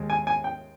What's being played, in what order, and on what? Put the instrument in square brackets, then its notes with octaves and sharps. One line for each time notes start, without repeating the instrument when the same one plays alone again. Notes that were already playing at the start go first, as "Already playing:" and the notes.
Already playing: [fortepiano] D#2 G#3
G#5
G#5
G5